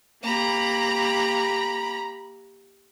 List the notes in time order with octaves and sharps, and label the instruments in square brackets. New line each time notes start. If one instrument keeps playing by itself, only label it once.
[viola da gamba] A#3 G4 [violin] A#5 B5